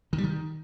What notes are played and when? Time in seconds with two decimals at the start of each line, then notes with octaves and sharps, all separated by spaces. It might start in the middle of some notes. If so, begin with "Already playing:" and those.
0.13 D#3
0.18 G3
0.24 D#3